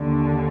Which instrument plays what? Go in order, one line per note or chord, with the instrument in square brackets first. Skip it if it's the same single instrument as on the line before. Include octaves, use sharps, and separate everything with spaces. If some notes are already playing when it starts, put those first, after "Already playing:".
Already playing: [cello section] D#2 D3